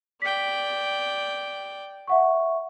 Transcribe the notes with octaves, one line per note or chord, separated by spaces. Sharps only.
D5 G5 B6
E5 F#5 C#6